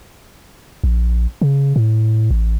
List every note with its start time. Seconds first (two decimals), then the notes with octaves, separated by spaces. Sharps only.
0.84 A#1
1.42 C#3
1.76 A2
2.31 A1